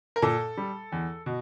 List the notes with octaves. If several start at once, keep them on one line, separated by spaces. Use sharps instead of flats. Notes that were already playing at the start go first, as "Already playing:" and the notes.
A#4
A#2 A4
G3
E2
B2